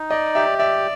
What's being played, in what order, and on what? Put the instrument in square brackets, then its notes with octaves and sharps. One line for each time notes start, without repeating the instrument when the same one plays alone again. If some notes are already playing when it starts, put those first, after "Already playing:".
Already playing: [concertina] D#4
[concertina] D5 [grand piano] D#5
[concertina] G4 [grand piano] E5
[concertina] D5 [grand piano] E5